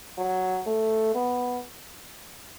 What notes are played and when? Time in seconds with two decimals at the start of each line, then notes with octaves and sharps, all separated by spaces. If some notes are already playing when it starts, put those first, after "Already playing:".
0.18 F#3
0.67 A3
1.15 B3